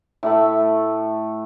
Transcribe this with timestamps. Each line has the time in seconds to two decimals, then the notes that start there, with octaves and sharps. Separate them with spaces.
0.23 A2 A3 B5